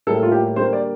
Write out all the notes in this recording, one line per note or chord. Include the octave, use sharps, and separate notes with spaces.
A2 G3 A#3 A4
F4
G4
D3 G3 A#3 C5
D5